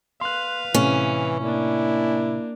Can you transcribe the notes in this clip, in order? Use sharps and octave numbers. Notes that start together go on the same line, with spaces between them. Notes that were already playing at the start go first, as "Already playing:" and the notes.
B4 F5 C6 F#6
A2 C3 E3 C#4
A#3 D4 E4